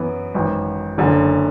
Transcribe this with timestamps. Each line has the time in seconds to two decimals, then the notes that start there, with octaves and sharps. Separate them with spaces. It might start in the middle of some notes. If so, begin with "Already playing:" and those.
Already playing: F#2 E3 B3
0.34 G#1 F#2 E3
0.98 F#1 F#2 D3